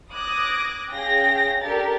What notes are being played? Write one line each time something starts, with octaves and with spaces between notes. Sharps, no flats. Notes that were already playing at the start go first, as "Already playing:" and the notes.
D6 D#6 F#6 G#6 A#6
C#4 G#4 F5 G5 A#6
D4 G4 A4 A#4 A6